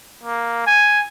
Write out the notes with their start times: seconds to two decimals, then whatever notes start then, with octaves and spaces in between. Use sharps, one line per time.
0.23 A#3
0.66 G#5